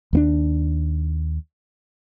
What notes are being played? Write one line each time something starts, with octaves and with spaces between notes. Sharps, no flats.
D#2 A#3 D4